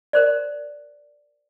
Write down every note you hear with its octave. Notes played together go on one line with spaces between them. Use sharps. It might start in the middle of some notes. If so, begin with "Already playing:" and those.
A#4 C5 D5